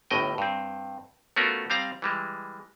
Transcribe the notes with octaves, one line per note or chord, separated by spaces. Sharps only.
G1 A2 D#5 G5
G2 C4
A3 B3 C#4 F4 F#4 A#4
G3 C4 F5 A#5
E3 G3 G#3